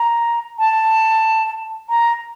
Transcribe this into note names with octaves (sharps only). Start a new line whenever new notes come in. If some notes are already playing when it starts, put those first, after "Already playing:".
Already playing: A#5
A5
A#5